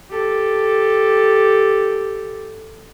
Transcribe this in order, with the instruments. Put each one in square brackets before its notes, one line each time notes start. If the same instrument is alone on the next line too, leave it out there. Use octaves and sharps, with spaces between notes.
[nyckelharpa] G4 A4